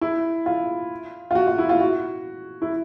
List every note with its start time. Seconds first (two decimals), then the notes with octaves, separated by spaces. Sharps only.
0.01 E4
0.46 F4
1.31 F4
1.35 F#4
1.47 F4
1.58 E4
1.69 F4
1.80 F#4
2.62 E4